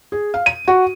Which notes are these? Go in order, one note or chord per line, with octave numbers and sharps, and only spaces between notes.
G#4
F5
D#7
F#4